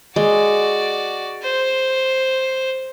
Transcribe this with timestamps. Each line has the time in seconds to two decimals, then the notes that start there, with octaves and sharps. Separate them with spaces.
0.16 G#3 F#4 D5
1.43 C5